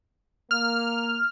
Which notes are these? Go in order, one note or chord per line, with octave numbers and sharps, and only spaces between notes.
A#3 F6